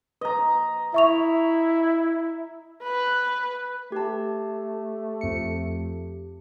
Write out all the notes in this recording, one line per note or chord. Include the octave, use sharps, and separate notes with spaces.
B4 D#5 A#5
E4 E5 C#6 F7
B4
A3 G4 A5
F2 C#7